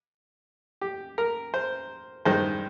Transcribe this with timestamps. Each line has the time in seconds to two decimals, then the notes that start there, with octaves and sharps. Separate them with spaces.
0.81 G4
1.18 A#4
1.54 C5
2.25 G2 D#3 G#3 C5